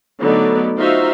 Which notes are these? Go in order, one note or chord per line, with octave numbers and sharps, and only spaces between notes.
D3 F#3 A3 B3 D#4 D5
D#4 F4 F#4 C5 E5 F5